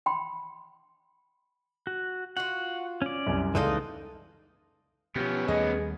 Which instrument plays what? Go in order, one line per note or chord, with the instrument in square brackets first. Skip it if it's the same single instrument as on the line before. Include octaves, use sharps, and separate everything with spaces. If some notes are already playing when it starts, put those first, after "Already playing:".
[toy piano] G5 B5 C6
[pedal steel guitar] F#4
[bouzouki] F4 F#4 [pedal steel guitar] F#5
[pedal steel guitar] C#4 D5
[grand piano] C2 F#2 C3
[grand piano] C#2 C6 [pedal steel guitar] E3 D#4 D#5 [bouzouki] A#3 A4 D5
[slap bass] B2 F3 [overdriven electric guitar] B3 C#4 [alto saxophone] G4
[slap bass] D#2 G3 A3 [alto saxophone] G#4 [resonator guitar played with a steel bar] D#5